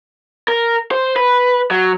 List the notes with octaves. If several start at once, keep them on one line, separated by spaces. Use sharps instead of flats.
A#4
C5
B4
F#3